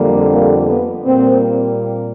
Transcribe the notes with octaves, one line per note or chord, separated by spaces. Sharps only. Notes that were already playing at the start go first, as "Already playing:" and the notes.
Already playing: F2 D3 G3 A#3
A#3
B3
A#2 G3 A#3 C4